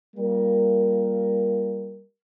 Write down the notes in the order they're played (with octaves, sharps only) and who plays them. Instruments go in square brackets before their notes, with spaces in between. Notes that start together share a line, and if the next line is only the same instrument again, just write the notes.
[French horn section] G3 A#3 F4 A#4